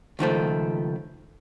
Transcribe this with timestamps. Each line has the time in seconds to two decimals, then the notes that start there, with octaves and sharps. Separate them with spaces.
0.19 C#2 D#3 F3 A3